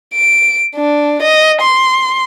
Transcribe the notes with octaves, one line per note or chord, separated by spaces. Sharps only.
D7
D4
D#5
C6